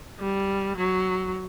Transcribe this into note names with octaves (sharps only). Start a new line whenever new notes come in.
G3
F#3